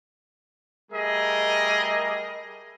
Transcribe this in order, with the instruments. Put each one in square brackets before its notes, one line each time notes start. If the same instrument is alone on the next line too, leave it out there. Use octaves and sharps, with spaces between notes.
[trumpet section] G3 A3 G#4 A#4 D#5